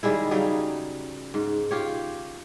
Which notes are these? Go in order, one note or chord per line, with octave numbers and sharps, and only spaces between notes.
D#3 G3 G#3 E4
C#3 F#3 G3 D#4
G#2
F4 G4 C#5